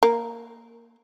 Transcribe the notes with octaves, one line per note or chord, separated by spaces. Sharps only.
A#3